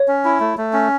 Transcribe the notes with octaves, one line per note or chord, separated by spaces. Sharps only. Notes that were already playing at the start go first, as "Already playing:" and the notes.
Already playing: C#5
C#4
E4
A3
A3
C#4